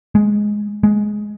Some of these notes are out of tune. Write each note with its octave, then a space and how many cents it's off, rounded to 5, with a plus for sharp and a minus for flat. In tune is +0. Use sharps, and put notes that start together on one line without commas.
G#3 +5
G#3 +10